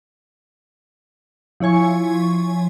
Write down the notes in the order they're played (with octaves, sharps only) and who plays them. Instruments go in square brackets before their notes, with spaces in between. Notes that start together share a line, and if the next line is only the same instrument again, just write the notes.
[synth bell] F3 E4 C#5 G#5 C#6